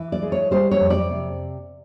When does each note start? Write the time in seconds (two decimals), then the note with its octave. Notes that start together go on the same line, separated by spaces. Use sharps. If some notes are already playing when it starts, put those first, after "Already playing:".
Already playing: E3
0.12 D5
0.22 G#3
0.32 C#5
0.51 G3 C5
0.71 C#5
0.80 F2
0.90 D5
1.10 C3